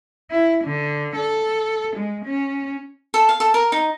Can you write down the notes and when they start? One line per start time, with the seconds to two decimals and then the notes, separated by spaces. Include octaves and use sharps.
0.31 E4
0.64 D3
1.16 A4
1.96 G#3
2.24 C#4
3.14 A4
3.29 F5
3.40 A4
3.54 A#4
3.72 D#4